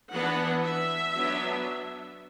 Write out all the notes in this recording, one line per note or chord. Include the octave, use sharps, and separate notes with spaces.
E3 B3 D4 F#5
E5
F#3 B3 D4